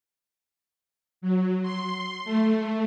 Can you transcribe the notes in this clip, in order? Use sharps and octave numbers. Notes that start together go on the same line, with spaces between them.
F#3
C6
A3